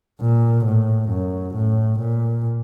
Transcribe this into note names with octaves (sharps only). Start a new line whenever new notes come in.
A#2
A2
F#2
A2
A#2